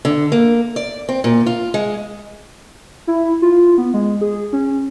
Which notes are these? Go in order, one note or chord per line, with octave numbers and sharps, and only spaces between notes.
D3
A#3
D5
C4
A#2
F4
G#3
E4
F4
B3
G#3
G#4
C#4